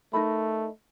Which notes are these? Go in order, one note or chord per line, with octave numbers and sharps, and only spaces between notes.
A3 D#4 A#4 B5